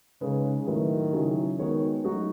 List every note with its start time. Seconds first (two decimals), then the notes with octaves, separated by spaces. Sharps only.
0.21 C#3 G#3 D#4 G#4 B4
0.67 A2 D#3 F#3 A3 E4 B4
1.13 C#3 F#3 C#4 E4 G#4
1.58 D#3 G#3 B3 F#4 C#5
2.04 F#3 A3 D#4 F#4